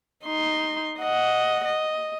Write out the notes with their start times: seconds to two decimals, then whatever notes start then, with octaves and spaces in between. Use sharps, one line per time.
0.25 D#4 C6
0.99 D#5 F#5
1.65 D#5